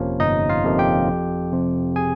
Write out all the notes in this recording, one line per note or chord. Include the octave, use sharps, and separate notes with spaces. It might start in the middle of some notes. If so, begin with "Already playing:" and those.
Already playing: G1 F2 C3 F3 A#3 C#4 C#5
G1 D#4 D#5
F4 F5
F2 C3 F3 A#3
G4 G5
F2
C3 F3 C4
G#4 G#5